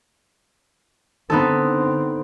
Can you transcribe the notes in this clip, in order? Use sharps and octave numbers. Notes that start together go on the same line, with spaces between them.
D3 B3 C4 D#4 A4